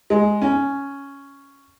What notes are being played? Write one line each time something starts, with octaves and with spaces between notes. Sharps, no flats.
G#3
C#4